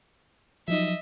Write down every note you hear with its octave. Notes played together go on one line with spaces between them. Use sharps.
F3 F#3 D#4 D#5 E5